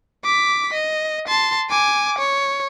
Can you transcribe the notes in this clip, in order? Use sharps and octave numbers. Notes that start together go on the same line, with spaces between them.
D6 B6
D#5
A5 C6
G#5 D6
C#5